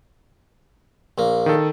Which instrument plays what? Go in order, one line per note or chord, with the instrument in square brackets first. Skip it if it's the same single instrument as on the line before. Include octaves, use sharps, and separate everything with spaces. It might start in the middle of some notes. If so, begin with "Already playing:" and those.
[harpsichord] A#1 A#3
[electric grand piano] D#3 A4